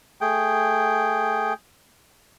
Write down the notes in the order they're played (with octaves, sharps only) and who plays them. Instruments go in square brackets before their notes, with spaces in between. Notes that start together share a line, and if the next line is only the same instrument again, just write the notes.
[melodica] A3 G#4 G5